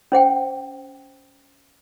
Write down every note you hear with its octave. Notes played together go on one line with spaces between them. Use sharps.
C#4 C5 F#5 G5